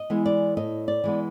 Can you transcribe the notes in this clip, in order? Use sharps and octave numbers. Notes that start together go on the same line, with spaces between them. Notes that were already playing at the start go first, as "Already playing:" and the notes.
Already playing: D#5
E3 G#3 B3
D5
A2 D#5
D5
E3 G#3 B3